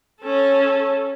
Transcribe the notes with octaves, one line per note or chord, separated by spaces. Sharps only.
C#4 A4